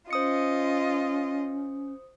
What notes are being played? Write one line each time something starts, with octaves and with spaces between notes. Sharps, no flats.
C#4 F4 C5 D#5 D#6 C#7